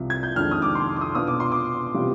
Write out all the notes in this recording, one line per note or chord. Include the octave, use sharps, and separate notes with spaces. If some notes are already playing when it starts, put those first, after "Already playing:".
Already playing: C2 C3 F3
G#6
G6
F2 D#3 G#3 D4 F6
D#6
D6
C6
D6
D#6
B2 B3 D4 F4 D#6
D6
C6
D6
C3 G3 B3 F4